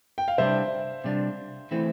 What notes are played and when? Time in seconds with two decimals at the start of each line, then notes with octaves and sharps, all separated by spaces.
0.18 G5
0.28 F5
0.38 C3 G3 D4 C5 E5
1.04 C3 G3 D4
1.71 E3 A3 C4 E4